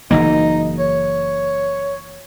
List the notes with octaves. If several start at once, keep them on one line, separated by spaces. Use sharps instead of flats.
F#1 E3 A#3 D#4
C#5